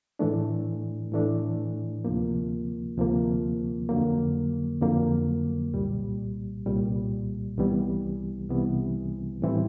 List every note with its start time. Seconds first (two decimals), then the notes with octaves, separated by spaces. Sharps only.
0.19 A2 E3 A3 D4
1.12 A2 E3 A3 D4
2.05 D2 C3 F3 A#3
2.97 D2 C3 F3 A#3
3.89 F2 D3 F#3 A#3
4.81 F2 D3 F#3 A#3
5.74 C2 A#2 G3
6.66 C2 A#2 G3
7.58 C2 C3 E3 G3 B3
8.50 C2 C3 E3 G3 B3
9.42 A2 E3 G3 C4 E4